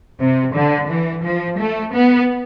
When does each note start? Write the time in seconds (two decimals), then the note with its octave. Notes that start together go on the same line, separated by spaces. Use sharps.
0.19 C3
0.54 D3
0.89 E3
1.24 F3
1.59 A3
1.93 B3